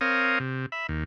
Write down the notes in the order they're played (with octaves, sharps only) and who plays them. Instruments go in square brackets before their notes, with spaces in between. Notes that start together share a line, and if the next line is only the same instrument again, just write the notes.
[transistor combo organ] C4 A#4 C#5 F5 D#6
C3
E5 B5
D#2